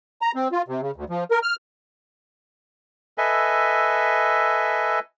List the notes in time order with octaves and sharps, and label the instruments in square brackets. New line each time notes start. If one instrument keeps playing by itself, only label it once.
[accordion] A#5
C4
F4
C3
C#3
D2
F3
A#4
F6
[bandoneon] A4 B4 D#5 E5 G#5